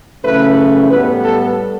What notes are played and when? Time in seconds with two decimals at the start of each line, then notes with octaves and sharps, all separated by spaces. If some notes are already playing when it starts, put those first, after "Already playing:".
0.23 F#2 C#3 E3 A3 B4
0.90 A2 G3 B3 B4
1.24 A4